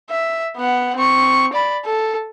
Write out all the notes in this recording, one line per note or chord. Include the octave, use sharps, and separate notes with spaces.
E5
B3 F#5
C4 C#6
D5 B5
A4